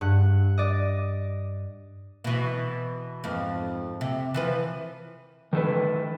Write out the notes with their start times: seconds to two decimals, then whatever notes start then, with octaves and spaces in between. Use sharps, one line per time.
0.01 G2 F#5
0.58 D5 D#5
2.24 B2 E3
3.24 F2 G#2
4.01 C3
4.34 E3 F3 B4
5.53 D#3 A4 B4